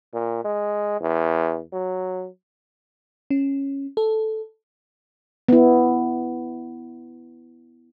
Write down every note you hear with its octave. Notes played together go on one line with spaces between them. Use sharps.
A#2
G#3
E2
F#3
C#4
A4
B3 E4